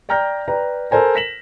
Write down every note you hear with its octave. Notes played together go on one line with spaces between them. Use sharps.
D5 G5 A#5 F6 G6 A#6
B4 D5 G5 A#5
A4 A#4 C5 G#5 A#5
A#6 B6 E7 F#7